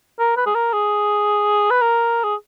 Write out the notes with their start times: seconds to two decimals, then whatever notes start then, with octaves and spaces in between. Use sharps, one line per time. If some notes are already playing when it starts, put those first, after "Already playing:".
0.19 A#4
0.37 B4
0.46 G#4
0.55 A#4
0.73 G#4
1.71 B4
1.81 A#4
2.24 G#4